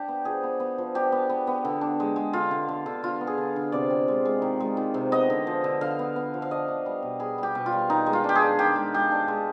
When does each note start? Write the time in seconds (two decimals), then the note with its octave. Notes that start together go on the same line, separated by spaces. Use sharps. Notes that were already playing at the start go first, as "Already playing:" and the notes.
Already playing: D4 G4
0.08 B3
0.25 F3 G#4
0.43 B3
0.60 B3
0.78 F3
0.95 D4 G4
1.12 B3
1.30 B3
1.47 B3
1.65 D3
1.81 D4
2.00 G#3
2.16 G#3
2.33 D3 F4
2.51 D3
2.68 D3
2.86 D3
3.03 D3 F4
3.21 B3
3.27 G#4
3.38 D3
3.56 D3
3.72 C3 D5
3.90 C4
4.08 G#3
4.25 G#3
4.42 D#3
4.60 G#3
4.77 D#3
4.94 C3
5.12 B3 D#5
5.30 D3
5.47 F3
5.64 D3
5.81 D3 F5
5.99 B3
6.16 B3
6.34 F3
6.42 F5
6.51 D4 D#5
6.68 D4
6.86 G3
7.03 B2
7.20 B3 G#4
7.38 G3 G4
7.55 B2
7.66 F4
7.72 G3
7.90 D#3 D#4
8.06 G#3
8.13 F4
8.24 D4 G4
8.35 G#4
8.42 D4
8.59 D#3 G4
8.76 G#3
8.94 G#3 G4
9.12 D4
9.28 G#3